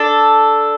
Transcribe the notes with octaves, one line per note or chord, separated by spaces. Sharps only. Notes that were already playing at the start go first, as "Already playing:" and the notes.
Already playing: D4 A4